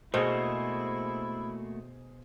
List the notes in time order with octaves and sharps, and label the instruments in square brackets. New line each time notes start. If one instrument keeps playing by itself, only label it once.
[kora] B2 [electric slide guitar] A3 A#3 F#4 [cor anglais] E4 [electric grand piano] G#4 C5